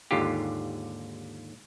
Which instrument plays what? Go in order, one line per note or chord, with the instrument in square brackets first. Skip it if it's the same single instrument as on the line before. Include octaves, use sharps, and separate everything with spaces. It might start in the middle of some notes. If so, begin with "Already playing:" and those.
[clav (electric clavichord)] D#2 G#2 D3 F4 G4